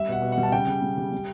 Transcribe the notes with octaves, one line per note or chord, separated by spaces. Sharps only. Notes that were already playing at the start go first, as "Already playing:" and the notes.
Already playing: G3 E5
B2 F#5
B2
F#5
G3
A5
C#3 G5
C#3
G3
G3
G3